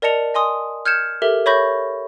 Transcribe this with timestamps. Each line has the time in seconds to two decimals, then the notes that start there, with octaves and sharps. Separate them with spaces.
0.02 A#4 D5 D#5 A5 C#7 F7
0.34 D#5 G#5 C6 D#6
0.86 F6 G6 G#6 C#7 E7
1.22 G4 A4 A#4 E5
1.46 C#5 E5 B5 C#6 G6 A#6